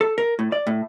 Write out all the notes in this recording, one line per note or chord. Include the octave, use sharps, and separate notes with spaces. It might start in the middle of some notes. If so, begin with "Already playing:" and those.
A4
A#4
A2
D5
A2